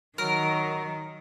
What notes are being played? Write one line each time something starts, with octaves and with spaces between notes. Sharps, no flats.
D#3 F#3 A#4